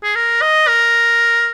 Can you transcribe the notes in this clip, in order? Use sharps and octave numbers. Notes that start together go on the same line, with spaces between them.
G#4
A#4
D#5
A#4